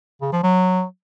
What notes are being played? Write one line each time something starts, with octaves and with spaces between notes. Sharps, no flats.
C#3
F3
F#3